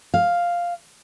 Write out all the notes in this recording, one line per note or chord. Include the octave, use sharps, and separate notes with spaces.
F5